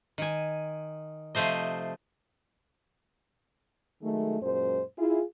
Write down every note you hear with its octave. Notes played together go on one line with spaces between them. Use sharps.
D#3 G#5
C3 F3 A3 C5 D#5
D#3 F#3 G#3 A3
F#2 A#2 G#3 C5
E4 F4 G#4